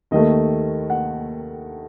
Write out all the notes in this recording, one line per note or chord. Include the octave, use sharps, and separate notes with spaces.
D#2 D#3 A3 D#5
F#5